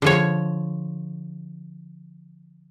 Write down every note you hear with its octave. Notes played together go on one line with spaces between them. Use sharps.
D3 F3 C#5